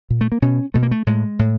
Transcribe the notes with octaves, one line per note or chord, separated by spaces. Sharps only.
A#2
A3
A#3
B2 C#4
B2 A3
A#3
A3
A2 G#3
A2